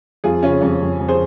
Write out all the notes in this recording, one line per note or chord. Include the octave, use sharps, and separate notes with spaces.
F2 F4 G#4
C#3 C#4 F4
F2 C#4
F2
F2
G#4 C5